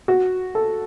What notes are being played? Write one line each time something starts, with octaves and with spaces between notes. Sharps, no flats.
F#4
A4